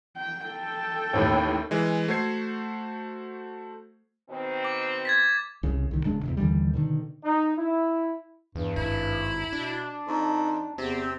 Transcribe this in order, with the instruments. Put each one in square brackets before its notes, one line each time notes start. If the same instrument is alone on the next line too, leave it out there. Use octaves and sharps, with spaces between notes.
[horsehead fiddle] G5
A4 G5
[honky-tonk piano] A1 D#2 A2
[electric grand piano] E3 G#3
A3 F#4 C5 G#6 C7
[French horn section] B2 D#3 C4
[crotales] D6
G#6 A6 B6
[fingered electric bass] C2 C#3
C2 D#3
E1 C#3 G#3 D4
E2 A2 C3
D#2 D3 E3 G3
B2 D3 D#3
[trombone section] D#4
E4
[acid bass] E2 [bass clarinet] G2
[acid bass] G#1 [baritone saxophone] E4
[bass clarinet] B2 [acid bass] D4
[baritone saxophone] F2 [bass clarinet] D#4
[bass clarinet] E2 [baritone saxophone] C3 [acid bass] C4